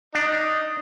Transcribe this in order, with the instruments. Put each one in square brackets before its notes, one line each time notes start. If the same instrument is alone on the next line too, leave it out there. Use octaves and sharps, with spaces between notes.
[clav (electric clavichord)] D4 [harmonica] D#4